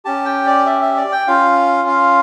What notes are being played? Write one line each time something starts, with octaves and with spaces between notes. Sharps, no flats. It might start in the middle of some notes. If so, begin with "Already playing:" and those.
C#4 G4 A5
G5
D5
E5
E5
D5
G5
C#4 F4 F5
F5